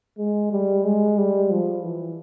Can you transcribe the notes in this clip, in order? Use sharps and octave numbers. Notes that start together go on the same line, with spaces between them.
G#3
G3
G#3
G3
F3
E3